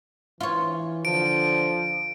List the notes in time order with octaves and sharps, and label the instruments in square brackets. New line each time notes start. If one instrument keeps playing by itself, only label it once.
[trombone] E3 [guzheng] F4 C#5
[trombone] D3 [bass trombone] F3 [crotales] D7